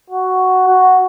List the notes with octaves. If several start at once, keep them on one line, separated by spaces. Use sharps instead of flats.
F#4
F#4